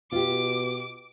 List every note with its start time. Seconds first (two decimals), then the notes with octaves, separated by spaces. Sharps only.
0.12 B2 F4 G4 D6